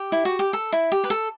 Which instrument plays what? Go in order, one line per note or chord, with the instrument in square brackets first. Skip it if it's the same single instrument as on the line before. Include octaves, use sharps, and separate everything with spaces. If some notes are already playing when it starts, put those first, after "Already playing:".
Already playing: [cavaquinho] G4
E4
F#4
G4
A4
E4
G4
B4
A4